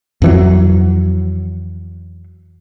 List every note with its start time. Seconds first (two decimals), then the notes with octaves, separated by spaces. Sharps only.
0.22 F2 E3 F#3